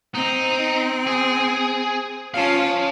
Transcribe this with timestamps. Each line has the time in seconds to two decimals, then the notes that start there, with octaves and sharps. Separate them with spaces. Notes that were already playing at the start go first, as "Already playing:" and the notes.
0.15 C4 D#4
1.07 G#4
2.34 C#4 F4 F5 A5